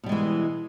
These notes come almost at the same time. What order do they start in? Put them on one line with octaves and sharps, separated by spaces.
B2 G3 G#3 E3